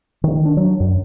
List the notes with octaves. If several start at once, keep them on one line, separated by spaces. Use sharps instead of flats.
D#3
D4
F#3
F#2